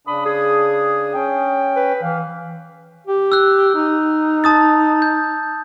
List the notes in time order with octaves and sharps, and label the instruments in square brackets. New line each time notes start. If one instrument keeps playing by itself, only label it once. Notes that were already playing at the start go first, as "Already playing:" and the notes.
[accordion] C#3 D4 D#6 [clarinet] B5
[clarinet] G#4
[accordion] C#4 G5
[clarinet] B4
[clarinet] E3 [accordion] F5
[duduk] G4
[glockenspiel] E6 F#6
[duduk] D#4
[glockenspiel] A5 D#6 A6
G6